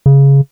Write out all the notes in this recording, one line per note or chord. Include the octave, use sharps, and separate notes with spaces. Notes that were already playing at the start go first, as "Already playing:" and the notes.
C#3